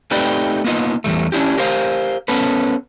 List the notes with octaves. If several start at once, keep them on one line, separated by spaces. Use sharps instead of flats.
A3 C4 D#4 G4 B4 D5
A#3 B3 D#4 F4 D#5
E2 G#2 G3 A3
C#4 D4 E4 G4
G4 A#4 C5 F5
B3 C#4 A4 B4